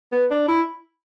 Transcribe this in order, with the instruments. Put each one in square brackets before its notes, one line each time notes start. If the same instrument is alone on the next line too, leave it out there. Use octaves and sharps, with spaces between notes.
[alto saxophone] B3
D4
E4